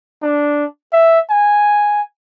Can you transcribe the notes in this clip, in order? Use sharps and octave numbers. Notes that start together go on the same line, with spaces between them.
D4
E5
G#5